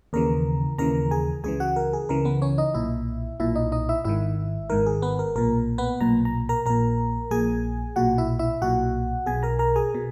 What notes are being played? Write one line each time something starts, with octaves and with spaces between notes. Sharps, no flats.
D#2 C#3 E3 A#4 A#5
D#2 C#3 E3 A#4 A#5
G#4 G#5
C#2 C#3 E3 G#4 G#5
F#4 F#5
A#4
G#4
C#2 C#3 E3 A#4
B3 B4
C#4 C#5
D#4 D#5
B1 A#2 E4 E5
B1 A#2 E4 E5
D#4 D#5
D#4 D#5
E4 E5
G#1 G#2 D#3 E4 E5
G#1 G#2 D#3 A#4
G#4
B3 B4
A#4
B1 A#2 A#4
B3 B4
B1 A#2 A#5
A#5
A#4 A#5
A#1 A#2 A#4 A#5
A#1 A#2 G#4 G#5
B1 A#2 F#4 F#5
E4 E5
E4 E5
B1 A#2 F#4 F#5
B1 B2 G#4 G#5
A#4 A#5
A#4 A#5
G#4 G#5
B2